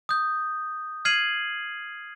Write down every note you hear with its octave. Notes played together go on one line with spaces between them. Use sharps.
D#6 G6
F6 G#6 C7 D#7 F#7